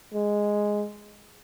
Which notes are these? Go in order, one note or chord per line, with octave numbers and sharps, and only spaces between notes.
G#3